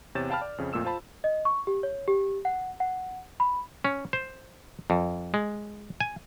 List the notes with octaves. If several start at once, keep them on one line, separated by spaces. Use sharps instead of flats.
E2 C3 C#5 G6 A6 E7
F5 G5 A5 B5 F6
D5
F2 C#3
F2 A#2 A3 E6 E7
F4 C5 A5 B5
D#5
C#6
G4
C#5
G4
F#5
F#5
B5
C#4
C5
F2
G#3
G#5